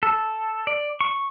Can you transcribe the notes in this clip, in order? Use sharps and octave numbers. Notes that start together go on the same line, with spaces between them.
A4
D5
C#6